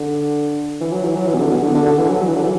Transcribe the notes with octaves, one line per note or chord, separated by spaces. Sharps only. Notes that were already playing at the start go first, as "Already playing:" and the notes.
Already playing: D3
E3
F#3
E3
F#3
E3
B2
D3
B2
D3
D3
D3
E3
F#3
F#3
E3
D3
E3